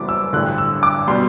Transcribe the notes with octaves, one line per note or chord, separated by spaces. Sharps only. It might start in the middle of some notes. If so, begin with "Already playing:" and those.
Already playing: F#1 F#2 E3 G3 B3 D6
E6
A1 G2 D3 F#6
E6
D6
B2 G3 C6